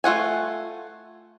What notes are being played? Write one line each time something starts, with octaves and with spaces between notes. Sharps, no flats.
A3 F4 F#5 G#5